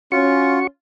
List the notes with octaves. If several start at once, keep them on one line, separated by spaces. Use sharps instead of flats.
C#4 F4 F#4 C#6